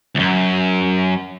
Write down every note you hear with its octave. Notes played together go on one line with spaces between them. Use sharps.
C#2 F#2